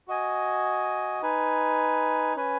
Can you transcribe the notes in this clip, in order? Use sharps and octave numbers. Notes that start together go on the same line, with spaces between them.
F#4 D#5 G#5
D#4 B4 G#5
C#4 B4 G#5